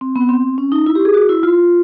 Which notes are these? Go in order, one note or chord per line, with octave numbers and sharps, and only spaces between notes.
C4
B3
C4
C#4
D#4
E4
G4
G#4
F#4
E4
F4